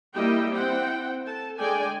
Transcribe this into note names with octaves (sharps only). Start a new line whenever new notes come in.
G3 A#3 E4 G4 D#5 G5
C4 E4 F#5 G5
A4 A5
D3 G#3 D5 G5 G#5